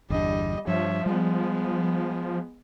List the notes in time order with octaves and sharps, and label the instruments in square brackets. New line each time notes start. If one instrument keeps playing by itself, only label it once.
[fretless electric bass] G1 E2 D4 [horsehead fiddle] G3 D#5
[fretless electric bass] G2 [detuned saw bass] F3 [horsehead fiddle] C#5 E5
[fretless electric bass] G3 [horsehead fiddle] G#3 B3